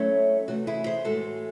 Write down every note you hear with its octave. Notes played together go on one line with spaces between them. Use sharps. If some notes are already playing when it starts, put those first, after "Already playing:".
Already playing: F#3 A3 C#4 E4 A4 C#5
C3 E3 A3 F#4
E4 G#4
G#4 C5
A2 E3 G#3 F#4 A4